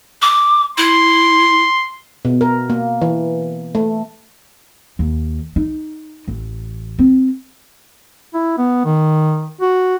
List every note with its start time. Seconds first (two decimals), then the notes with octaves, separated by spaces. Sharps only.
0.22 D6
0.78 E4 C6
2.25 B2
2.41 A#4
2.70 A#3
3.02 E3
3.75 A3
4.99 D#2
5.56 D#4
6.28 A1
6.99 C4
8.34 E4
8.58 B3
8.85 D#3
9.61 F#4